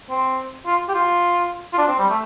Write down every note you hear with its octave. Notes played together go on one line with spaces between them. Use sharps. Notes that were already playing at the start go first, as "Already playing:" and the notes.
C4
F4
G4
F4
F4
D4
C4
G3
A3